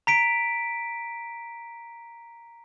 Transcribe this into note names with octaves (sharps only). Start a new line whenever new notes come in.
A#5 B6 D7